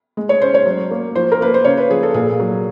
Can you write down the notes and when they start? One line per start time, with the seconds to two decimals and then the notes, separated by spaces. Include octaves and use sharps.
0.17 G#3
0.29 C#5
0.41 C#4 C5
0.54 C#5
0.66 F#3
0.91 A#3
1.15 F3 C5
1.32 A#4
1.41 A#3 B4
1.54 C5
1.65 C#3 C#5
1.77 B4
1.89 F3 G#4
2.03 A4
2.14 A#2 G#4
2.40 F#3